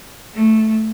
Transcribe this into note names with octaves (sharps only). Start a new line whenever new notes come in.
A3